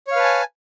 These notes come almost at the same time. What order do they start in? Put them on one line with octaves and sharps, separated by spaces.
C#5 F5 B4 A5 G#5